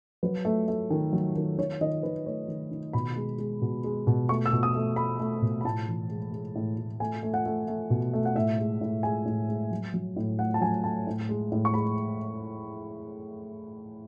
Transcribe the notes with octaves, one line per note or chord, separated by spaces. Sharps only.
F#3 B4
A3
A3
D#3
F#3
D#3
D#3 C#5
D#3 D#5
D#3 B4
A3 C#5
D#3
D#3
B2 B5
G#3
G#3
B2
G#3
B2
A3 C#6
E6
B2
D#6
A3
A3 B5
A3
B2
B5
A2 A5
E3
G#3
G#3
A2
A2
A3 G#5
A3
F#5
A3
A3
B2
A3
F#5
A2 E5
G#3
A2
G#3 G#5
A2
G#3
F#3
F#3
A2
A3 F#5
A5
F#3 G#5
A3 A5
A2
G#3
A2
C#6
G#3 B5